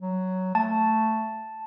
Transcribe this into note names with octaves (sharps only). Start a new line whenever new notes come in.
F#3
A3 A5